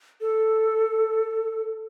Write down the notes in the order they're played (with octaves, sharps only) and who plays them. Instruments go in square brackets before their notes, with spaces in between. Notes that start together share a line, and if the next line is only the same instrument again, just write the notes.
[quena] A4